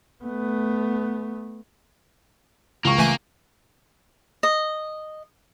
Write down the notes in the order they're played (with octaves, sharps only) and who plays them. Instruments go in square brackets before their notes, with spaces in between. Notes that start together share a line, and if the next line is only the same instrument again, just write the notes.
[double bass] A3 B3
[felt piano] C#2 C#6 [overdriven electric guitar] A#3
[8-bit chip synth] E3 A3 G#5
[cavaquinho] D#5